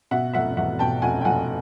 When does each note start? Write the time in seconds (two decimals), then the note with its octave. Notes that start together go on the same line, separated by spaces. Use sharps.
0.11 B2 E5 F#5
0.33 F1 E5 F#5
0.57 E2 E5 F#5
0.79 B2 G5 A5
1.02 F1 F#5 G#5
1.21 G5
1.25 F1 F#5 G#5